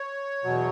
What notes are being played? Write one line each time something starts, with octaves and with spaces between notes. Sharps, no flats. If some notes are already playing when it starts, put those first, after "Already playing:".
Already playing: C#5
E2 B2 F#3